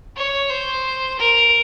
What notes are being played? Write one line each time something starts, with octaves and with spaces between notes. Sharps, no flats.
C#5
C5
A#4